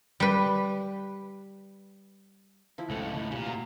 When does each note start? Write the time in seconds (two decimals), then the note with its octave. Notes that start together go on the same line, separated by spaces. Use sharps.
0.20 G3 B4
2.78 F3 E4
2.90 C#2 A2 A4 F#5
3.32 A#2 C#3 G4
3.46 F#3